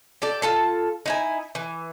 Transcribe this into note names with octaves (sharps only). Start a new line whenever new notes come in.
G4 A4 D5
F4 A4 A5
D#4 E4 G#5
E3